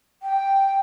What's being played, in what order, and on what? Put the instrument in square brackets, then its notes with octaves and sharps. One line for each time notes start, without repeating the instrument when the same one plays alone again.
[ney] G5